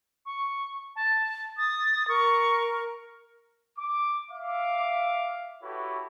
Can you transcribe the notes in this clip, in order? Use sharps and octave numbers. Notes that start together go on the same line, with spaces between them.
C#6
A5
D#6 A6
A#4 C#6
D6
E5 F5 D6
E4 F#4 G4 A4 B4 C#5